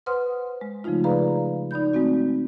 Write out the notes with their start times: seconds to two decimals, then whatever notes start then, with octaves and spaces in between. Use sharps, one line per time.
0.06 B4 C5 F#5 C6 D#6 F6
0.61 G#3
0.84 C#3 F3 G#3 A3 D#4 F4
1.04 G#4 B4 D5 F5 A#5 B5
1.71 D#4 D5 B5 G6
1.93 G#3 A3 C4 F#4